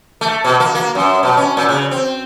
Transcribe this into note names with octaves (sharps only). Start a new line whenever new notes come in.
A3
B2
A#3
A#3
F#2
B2
C#4
A#2
C#3
C4